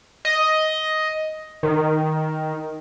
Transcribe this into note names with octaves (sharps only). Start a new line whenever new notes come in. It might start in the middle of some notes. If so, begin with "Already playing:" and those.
D#5
D#3